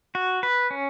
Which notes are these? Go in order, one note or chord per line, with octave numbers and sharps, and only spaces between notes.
F#4
B4
C#4